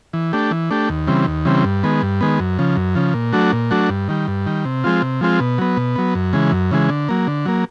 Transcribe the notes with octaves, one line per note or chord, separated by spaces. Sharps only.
E3
A3 D4 G4
E3
A3 D4 G4
D#2
C#3 E3 G3 C4
D#2
C#3 E3 G3 C4
G2
D#3 G#3 B3
G2
D#3 G#3 B3
F#2
C#3 F3
F#2
C#3 F3
A#2
F#3 A3 D4 F#4
A#2
F#3 A3 D4 F#4
G2
D#3 G3
G2
D#3 G3
C3
F3 G#3 C4 F4
C3
F3 G#3 C4 F4
B2
F#3 B3
B2
F#3 B3
F#2
C#3 E3 G#3
F#2
C#3 E3 G#3
D3
F#3 A#3
D3
F#3 A#3